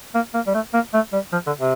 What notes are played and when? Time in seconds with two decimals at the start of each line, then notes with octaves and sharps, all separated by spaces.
0.14 A#3
0.34 A#3
0.47 G3
0.54 A3
0.74 A#3
0.94 A3
1.13 G3
1.33 F3
1.47 D3
1.59 C3